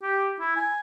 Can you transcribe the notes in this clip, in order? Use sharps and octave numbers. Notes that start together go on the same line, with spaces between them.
G4
E4
G#5